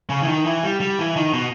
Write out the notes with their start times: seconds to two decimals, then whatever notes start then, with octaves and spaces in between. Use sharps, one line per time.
0.10 C#3
0.23 E3
0.28 D#3
0.46 E3
0.63 G3
0.80 G3
0.99 E3
1.16 D#3
1.33 B2